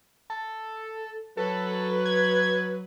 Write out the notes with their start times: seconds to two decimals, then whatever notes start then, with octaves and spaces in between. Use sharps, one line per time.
0.30 A4
1.37 F#3 A4 B4
2.05 G#6